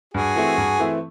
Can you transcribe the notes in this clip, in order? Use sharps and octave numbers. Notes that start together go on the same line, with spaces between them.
G2 F#4 G#4
E3 A3 C4 E4
G2
E3 A3 C4 E4